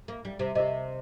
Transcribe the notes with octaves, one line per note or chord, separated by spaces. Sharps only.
A#3
G3
C3
C3 G4 A#4 D#5